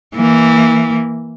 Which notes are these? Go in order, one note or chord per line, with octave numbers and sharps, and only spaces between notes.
E3 A#3